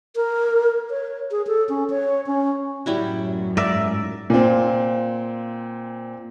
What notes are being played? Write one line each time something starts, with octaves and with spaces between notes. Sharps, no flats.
A#4
C#5
G#4
A4
C#4
C#5
C#4
F#2 A2 F#3 G3 E4 F#4
G#2 A#4 D5 E5
A#2 C4